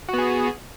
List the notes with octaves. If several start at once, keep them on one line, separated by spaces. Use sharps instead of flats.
B3 F#4 G#4